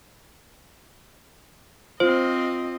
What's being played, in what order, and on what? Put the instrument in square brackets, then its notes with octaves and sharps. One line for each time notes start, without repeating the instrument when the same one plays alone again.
[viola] C4 D#5 [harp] F4 [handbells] C5